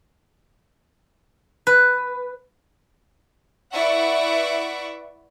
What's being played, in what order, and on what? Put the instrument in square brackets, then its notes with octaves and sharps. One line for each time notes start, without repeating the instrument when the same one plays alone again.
[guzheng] B4
[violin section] E4 B4 D5 E5 F#5 C#6